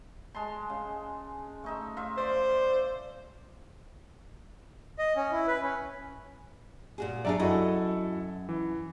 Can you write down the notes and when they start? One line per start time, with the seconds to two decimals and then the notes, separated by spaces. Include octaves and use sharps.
0.35 G#3 A5 C6
0.69 C#3
1.64 A3 D#4 E5
1.97 F4 E5
2.18 C5 D5 E5 F5
4.99 D#5
5.16 C#4
5.31 E4
5.47 B4
5.62 C#4
6.98 A#2 F#4 G#4
7.25 F#3 D4 G#4 D5 E5 A#5
7.40 F#2 E4 F#4 A4 D#5
8.49 E3